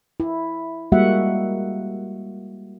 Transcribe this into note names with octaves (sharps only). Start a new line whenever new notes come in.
E4
G3 G#3 A#3 F#4 E5 F#5